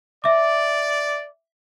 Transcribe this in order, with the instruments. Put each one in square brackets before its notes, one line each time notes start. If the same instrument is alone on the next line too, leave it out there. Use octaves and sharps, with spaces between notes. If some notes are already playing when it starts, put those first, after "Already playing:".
[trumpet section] D5 [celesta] E5 D6